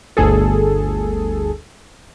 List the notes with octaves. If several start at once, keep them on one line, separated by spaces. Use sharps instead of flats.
G1 D2 G#4 A4